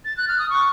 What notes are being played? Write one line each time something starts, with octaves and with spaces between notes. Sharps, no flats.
A6
F#6
F6
D#6
C#6